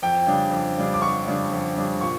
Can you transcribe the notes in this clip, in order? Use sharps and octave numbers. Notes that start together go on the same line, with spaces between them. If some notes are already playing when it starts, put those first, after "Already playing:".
F2 G5
C#3 G3 D4
F2
C#3 G3 D4
D6
F2 C#6
C#3 G3 D4
F2
C#3 G3 D4
A#2 C#6